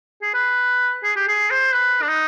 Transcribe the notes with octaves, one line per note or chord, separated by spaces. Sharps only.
G#4
B4
G#4
G4
G#4
C5
B4
D4
D#4